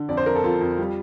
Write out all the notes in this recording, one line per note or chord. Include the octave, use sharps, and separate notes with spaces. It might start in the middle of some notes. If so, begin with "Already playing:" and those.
Already playing: D3
F2 D5
C5
F2 A#4
A4
F2 F4
F2
G3